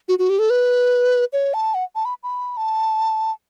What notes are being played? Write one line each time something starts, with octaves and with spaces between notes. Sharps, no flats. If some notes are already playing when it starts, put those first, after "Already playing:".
F#4
F#4
G4
A4
B4
C#5
A5
F#5
A5
B5
B5
A5